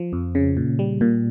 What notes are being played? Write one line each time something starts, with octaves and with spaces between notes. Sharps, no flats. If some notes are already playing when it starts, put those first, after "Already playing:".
Already playing: F3
F2
C#3
A#2
G3
A#2